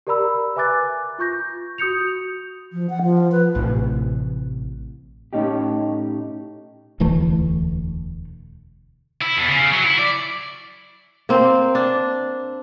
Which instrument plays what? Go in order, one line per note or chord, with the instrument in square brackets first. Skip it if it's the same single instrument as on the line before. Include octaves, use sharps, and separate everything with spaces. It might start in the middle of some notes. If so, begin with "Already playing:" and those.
[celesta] G4 A#4 D5 A#5 B5 E6
B4 E5 G#5 D6 F#6 A6
F4 C#6 G6 A#6
F#4 D#6 G6 C#7 F7
[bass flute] F3
F#5
F3
B4
[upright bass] A1 C3
[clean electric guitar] A2 A3 C#4 D#4 G4
[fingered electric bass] E1 D2 E3 A3
[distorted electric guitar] E4
E2
C#3
F#3
E4
D5
[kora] A#3 C4
D4